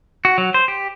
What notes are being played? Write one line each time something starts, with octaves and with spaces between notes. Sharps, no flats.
F#4
F#3
C5
G4